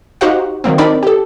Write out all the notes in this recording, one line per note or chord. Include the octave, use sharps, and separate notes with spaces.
D#4 F#4 G4 C5 F5 F#5
D#3 F#3 A#3 C4
C4 D4 D#4 A#4 D5 B5
G4 A4